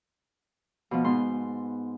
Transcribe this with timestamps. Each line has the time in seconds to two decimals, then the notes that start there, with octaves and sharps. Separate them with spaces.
0.91 B2 F3 B3
1.04 G#2 B3 C6